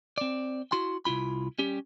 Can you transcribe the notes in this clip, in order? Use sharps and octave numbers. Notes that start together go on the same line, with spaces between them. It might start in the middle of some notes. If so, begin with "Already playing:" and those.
C4 D5
E4 F#4 C6
C2 E4 F4 B5
G3 C#4 G4